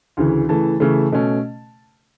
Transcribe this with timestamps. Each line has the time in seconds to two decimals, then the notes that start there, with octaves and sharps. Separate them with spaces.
0.17 D2 C#3 E3
0.49 C#3 E3 A3 A5
0.80 C#3 E3 A3
1.12 B2 A3 C#4